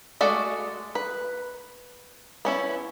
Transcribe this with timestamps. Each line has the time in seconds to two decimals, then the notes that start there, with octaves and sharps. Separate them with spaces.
0.21 G#3 A3 F#4 D5
0.95 B4
2.45 B3 C#4 E4